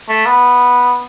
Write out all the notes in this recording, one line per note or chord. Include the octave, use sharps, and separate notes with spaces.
A3
B3